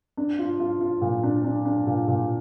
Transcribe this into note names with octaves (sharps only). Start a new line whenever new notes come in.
D4
F4
F4
F4
A#2
D4
D4
D4
A#2
A#2